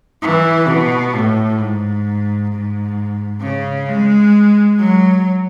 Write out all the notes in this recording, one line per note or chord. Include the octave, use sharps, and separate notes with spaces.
E3
B2
A2
G#2
G#2
C#3
G#3
F#3